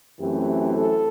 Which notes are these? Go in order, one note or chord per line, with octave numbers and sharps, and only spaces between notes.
F#2 E3 A3 C4 G4
A4